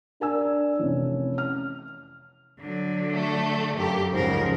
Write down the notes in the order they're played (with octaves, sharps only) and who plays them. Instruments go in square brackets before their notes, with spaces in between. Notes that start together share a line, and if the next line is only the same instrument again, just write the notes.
[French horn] D4 [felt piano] A#4 G#5 E6
[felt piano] F1 E3 [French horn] C#4
[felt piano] F6
[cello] D3 F#3
[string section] A3
[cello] F#2 [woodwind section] A#3 A4 [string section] G4
[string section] C#2 C#3 [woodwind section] G#2 [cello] F3 A#4